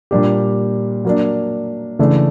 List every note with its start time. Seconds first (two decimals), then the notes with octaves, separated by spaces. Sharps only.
0.11 A#2 G3 A#3 D4 G4
1.05 F#3 A#3 D4
1.99 C#3 E3 A3 D4